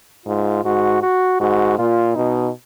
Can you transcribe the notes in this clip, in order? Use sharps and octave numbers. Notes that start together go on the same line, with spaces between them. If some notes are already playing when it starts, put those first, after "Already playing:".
G#2 F4
G#2 F#4
F#4
G#2 F#4
A#2 F4
B2 D#4